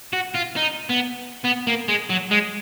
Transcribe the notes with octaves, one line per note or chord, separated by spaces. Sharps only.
F#4
F4
D#4
B3
B3
A#3
G#3
F#3
G#3